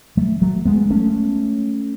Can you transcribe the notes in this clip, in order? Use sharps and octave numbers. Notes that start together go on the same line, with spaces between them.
F#3 A3
F#3 A3
G#3 B3
A3 C#4